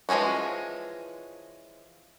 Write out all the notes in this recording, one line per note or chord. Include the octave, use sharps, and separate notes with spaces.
E3 F3 G#3 C#4 F#4